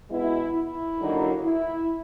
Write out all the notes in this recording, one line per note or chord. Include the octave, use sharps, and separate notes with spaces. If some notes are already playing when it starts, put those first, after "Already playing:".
B2 G#3 B3 E4
E4
D#2 D3 F#3 A#3 D#4
E4